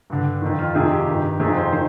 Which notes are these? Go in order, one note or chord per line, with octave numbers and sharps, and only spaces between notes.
G2 D3
F2 D#3
F4
F2 C3 D#3 G#4
G4
G2 D#3
F2 C3 D#3 G#4
C5
D#3 C5